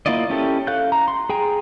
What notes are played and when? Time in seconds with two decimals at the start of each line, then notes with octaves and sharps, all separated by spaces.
0.06 A#3 E4 F4 D5 D#5
0.30 C#4 E4 G4 A4
0.67 A4 F5 F#6 G6
0.92 A#5
1.08 C6
1.30 G#4 G5 G#5 A#5